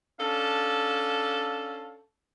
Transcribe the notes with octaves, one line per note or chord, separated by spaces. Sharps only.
C#4 D4 A4 F5 A5